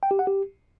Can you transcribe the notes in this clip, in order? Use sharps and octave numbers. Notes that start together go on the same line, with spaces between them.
G5
G4
F#5
G4